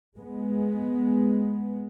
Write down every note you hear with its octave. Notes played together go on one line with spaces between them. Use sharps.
G#3 B3